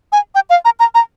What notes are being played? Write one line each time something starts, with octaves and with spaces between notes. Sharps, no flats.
G#5
G5
F5
A#5
A#5
A#5